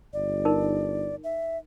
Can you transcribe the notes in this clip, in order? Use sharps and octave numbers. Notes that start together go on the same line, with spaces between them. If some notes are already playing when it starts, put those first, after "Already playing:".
G1 D5
D#4 A#4
E5